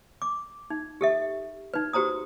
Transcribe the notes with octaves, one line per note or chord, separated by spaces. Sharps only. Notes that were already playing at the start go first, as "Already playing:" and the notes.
D6
D#4
G4 A4 E5
D#4 B4
F#4 G4 C5 A#5 D#6